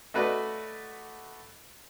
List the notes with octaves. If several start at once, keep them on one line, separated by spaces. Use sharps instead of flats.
A3 F#4 B4 D5 D#5